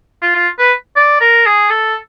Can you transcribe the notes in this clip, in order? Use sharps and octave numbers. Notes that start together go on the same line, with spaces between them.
F4
F4
B4
D5
A#4
G#4
A4